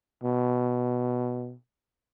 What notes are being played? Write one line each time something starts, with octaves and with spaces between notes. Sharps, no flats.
B2